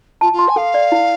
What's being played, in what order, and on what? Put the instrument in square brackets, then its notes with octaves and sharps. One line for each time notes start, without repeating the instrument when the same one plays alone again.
[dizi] F4 [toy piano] A5
[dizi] F4
[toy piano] C6
[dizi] G#5
[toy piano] A4 [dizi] F5
[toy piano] D5
E4